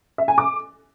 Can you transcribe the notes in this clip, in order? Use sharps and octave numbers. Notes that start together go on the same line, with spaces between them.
E5
G#5
D6